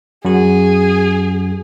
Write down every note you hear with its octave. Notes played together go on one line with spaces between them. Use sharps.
F#2 F#4 G#4